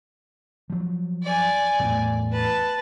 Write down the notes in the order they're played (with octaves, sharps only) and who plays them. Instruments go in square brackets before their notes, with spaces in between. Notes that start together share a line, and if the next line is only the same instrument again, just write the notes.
[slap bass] F3 F#3
[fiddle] D5 G#5
[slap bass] E2 A2
[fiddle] B4 A5